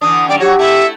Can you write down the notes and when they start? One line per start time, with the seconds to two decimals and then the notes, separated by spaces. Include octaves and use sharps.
0.01 D3 E3 D4 D#6
0.28 F#2 D#3 G3 D5 G5
0.40 F#3 F#4 G4 C#5
0.59 A3 E4 E5